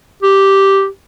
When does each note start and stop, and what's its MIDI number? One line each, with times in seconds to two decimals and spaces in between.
0.23 0.87 67